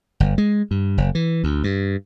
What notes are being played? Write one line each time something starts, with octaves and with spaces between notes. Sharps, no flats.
G1
G#3
G2
F#1
E3
D2
G2